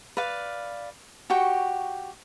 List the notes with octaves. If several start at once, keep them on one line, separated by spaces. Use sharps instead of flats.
B4 D5 F5
F#4 G4 G5 C#6